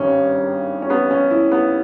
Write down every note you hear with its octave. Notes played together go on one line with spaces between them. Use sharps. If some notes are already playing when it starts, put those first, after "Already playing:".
Already playing: G#1 G2 D#3 G3 C#4
C#4
B3
C#4
E4
B3